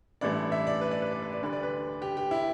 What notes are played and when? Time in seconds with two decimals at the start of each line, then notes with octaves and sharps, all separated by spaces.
0.21 A1 G2 E3 A3 D5
0.52 E5
0.67 D5
0.81 B4
0.92 D5
1.02 B4
1.12 D5
1.22 B4
1.33 D5
1.41 D2 D3 G3 B4
1.53 D5
1.63 B4
2.02 G4
2.17 G4
2.31 E4